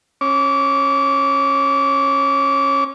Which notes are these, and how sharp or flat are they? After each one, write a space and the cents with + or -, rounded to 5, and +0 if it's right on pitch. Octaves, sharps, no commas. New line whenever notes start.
C#4 -20 D6 -30